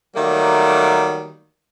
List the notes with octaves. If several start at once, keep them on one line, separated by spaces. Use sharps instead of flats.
D#3 F#3 G3 A3 A#3